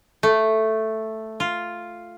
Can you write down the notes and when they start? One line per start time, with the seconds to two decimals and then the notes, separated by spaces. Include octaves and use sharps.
0.23 A3
1.40 F4